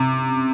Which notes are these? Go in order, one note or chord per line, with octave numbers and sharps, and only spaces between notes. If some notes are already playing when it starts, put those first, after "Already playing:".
Already playing: C3